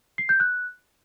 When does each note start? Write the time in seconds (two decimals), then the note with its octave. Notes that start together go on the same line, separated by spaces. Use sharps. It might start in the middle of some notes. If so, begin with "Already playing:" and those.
0.18 C7
0.29 G6
0.40 F#6